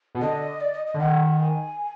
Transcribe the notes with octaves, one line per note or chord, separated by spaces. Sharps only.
B2
D3 D#5
D5
D#5
D#5
D3
D#3 F#5
G#5